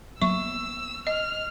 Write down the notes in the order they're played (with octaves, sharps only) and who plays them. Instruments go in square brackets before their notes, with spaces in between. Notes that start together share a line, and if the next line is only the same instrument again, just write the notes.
[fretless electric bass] F#3 A#3 B3 [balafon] E5 C#6 [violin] E6
[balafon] D#5 [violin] F6